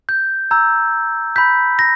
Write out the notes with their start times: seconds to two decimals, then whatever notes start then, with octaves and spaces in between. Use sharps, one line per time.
0.09 G6
0.51 A#5 E6 G6 G#6
1.36 B5 G6 B6
1.79 A#6